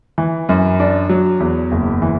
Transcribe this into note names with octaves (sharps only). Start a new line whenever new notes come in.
E3
F#2
D4
F#3
E2
F#1
E3